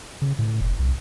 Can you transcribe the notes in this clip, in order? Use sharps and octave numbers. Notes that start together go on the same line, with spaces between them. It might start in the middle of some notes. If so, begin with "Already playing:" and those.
C#3
A2
F1
C2